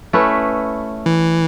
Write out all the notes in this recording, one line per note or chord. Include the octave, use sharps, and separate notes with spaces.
A3 C#4 E4 B4
E3